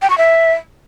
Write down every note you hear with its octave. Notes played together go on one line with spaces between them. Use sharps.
G5
C#6
E5